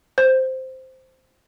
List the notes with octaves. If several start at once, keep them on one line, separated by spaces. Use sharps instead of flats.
C5